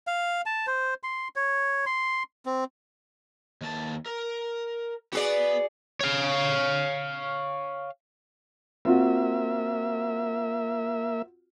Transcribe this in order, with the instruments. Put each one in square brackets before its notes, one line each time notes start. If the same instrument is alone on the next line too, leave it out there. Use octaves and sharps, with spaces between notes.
[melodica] F5
A5
C5
C6
C#5
C6
C4
[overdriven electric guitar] D#2 A5
A#4
[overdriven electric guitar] B3 [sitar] F#4 G#4 D5
[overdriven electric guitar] C#5 F5
[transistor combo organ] A#3 E5 [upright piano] C4 F4 F#4